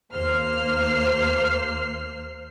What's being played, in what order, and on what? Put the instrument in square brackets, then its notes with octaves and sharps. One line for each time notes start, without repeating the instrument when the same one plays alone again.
[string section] D#2 A#3 C5 F6 C7